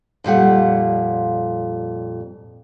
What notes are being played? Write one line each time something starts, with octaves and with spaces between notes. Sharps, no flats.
F2 A#2 G3 F#5